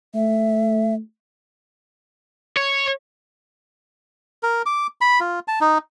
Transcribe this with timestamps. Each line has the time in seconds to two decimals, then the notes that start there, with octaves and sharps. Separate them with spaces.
0.15 A3 E5
2.57 C#5
4.43 A#4
4.66 D6
5.01 B5
5.20 F4
5.48 A5
5.61 D#4